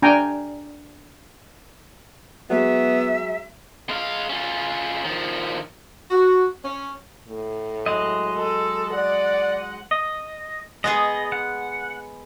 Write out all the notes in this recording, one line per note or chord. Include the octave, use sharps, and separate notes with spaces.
D4 G5 G#5 A#5
F#3 G#3 B3 E5
G#3 F5
C#4 F4
D#3 F3
F#4
C#4
A2
F#3 G#3 D#5
A4
D5 F#5
D#5
G#3 B3 G#4 D#5
F#5